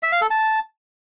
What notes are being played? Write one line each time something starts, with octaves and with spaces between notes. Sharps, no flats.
E5
F5
A4
A5